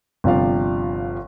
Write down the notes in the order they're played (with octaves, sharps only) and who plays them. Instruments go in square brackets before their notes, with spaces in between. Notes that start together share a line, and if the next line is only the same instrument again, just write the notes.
[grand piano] G1 C3 F3 D5 F5